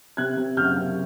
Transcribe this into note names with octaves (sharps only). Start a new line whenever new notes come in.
C3 F#6 G#6
C3
F#1 F6 G6
C3